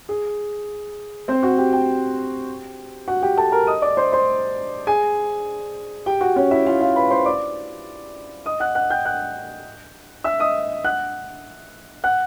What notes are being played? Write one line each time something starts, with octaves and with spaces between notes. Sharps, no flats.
G#4
C4 C5
F#4 F#5
G4 G5
G4 G5
F#4 F#5
G4 G5
A4 A5
A#4 A#5
D#5 D#6
D5 D6
C5 C6
C5 C6
G#4 G#5
G4 G5
F#4 F#5
C#4 C#5
E4 E5
F4 F5
F4 F5
B4 B5
C5 C6
D5 D6
D#5 D#6
F#5 F#6
F#5 F#6
G5 G6
F#5 F#6
E5 E6
D#5 D#6
F#5 F#6
F#5 F#6